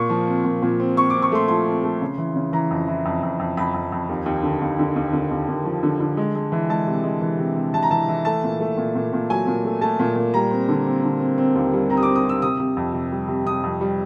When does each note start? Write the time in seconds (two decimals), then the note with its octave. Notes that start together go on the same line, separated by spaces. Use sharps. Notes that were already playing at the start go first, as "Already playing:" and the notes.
Already playing: A#2 C#6
0.09 F3
0.27 C4
0.44 A#2
0.62 A#2
0.80 C4
0.97 C4 C#6
1.10 C4 D6
1.22 C#6
1.32 A3 C6
1.48 F3 C6
1.66 C4
1.84 A3
2.01 C#3
2.18 E3
2.36 C#3
2.53 E3 A#5
2.71 F2
2.88 E3
3.05 F2
3.23 F2
3.39 F2
3.57 F2 B5
3.74 F2
3.92 F2
4.09 D#2
4.26 D#2
4.43 D3
4.61 D#2
4.79 D3
4.96 D#2
5.13 D3
5.31 D#2
5.48 D#2
5.65 F3
5.83 D3
6.00 D3
6.17 G#3
6.35 G#3
6.52 E3
6.69 G#3 A5
6.87 C3
7.03 G#3
7.21 E3
7.38 C3
7.56 C3
7.74 E3 A5
7.83 A#5
7.91 E3 A5
8.08 E3
8.25 A3 A5
8.43 A#2
8.60 A3
8.77 A#2
8.95 A#2
9.13 A#2
9.30 F#3 G#5
9.47 A#2
9.64 A3
9.81 A3 A5
10.00 A#2
10.16 A#2
10.34 G3 A#5
10.51 C4
10.69 D3
10.86 C4
11.03 D3
11.20 C4
11.38 C4
11.55 D#2
11.73 G3
11.90 C4 A#5
11.97 D#6
12.03 C4 D6
12.15 D#6
12.25 C4 E6
12.42 C3 D#6
12.60 C3
12.77 F2
12.93 C3
13.12 G3
13.28 C3
13.45 C3 D#6
13.63 F2
13.81 G3